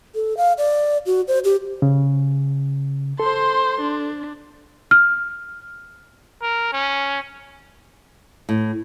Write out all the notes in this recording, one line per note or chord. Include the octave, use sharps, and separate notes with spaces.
A4
F5
D5
F#4
C5
G4
C#3
A4 C5 C6
D4
F6
A#4
C#4
A2